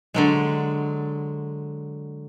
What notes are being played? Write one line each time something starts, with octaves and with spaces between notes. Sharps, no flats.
D3 F#3 G#3